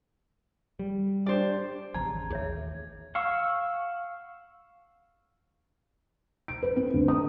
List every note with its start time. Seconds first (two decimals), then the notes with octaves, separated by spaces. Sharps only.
0.79 G3
1.26 D4 G4 C5 D5
1.94 G#1 E2 C#3 A5 A#5 G#6
2.30 A1 D#2 G#4 C#5 E5
3.15 F5 F#5 C#6 E6
6.48 D7
6.63 B4
6.76 C4
6.94 D2
7.08 D#6